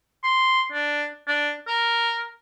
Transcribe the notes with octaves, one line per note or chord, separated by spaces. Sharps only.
C6
D4
D4
A#4